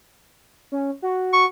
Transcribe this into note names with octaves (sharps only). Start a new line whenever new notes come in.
C#4
F#4
C#6